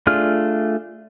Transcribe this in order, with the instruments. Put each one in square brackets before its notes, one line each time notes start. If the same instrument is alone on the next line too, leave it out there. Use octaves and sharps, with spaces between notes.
[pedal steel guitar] A3 D4 F4 G#4 F6